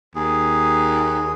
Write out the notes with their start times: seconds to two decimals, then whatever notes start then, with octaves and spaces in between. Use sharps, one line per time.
0.15 D#2 G#4